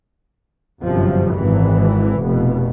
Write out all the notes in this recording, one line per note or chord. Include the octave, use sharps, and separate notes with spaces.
G1 F#2 C3 F3
G#1 E3
F1 B2